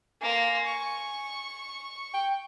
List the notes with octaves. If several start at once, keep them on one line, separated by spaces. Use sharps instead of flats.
A#3 G#5 C6
C#6
G5